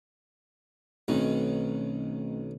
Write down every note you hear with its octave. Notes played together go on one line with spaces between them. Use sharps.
B1 D#3 A3 C4 C#4